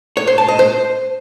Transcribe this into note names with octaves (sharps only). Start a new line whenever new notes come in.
C#5
C5
A5
D#5
C5